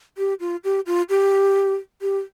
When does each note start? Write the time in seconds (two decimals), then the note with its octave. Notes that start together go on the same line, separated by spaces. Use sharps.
0.18 G4
0.40 F4
0.64 G4
0.86 F4
1.09 G4
2.02 G4